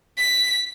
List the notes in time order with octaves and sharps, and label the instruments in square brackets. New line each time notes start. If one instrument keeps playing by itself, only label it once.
[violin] B6